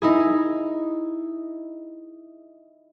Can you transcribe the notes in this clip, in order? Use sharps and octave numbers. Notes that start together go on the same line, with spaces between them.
D#4 E4 G#4